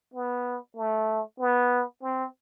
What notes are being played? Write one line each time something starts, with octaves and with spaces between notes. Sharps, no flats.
B3
A3
B3
C4